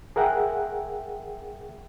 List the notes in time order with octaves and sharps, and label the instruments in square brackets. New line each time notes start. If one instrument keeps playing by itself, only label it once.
[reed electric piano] G#4 A#4 E5 F#5 G5